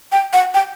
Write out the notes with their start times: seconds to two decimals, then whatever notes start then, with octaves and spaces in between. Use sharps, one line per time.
0.12 G5
0.33 F#5
0.54 G5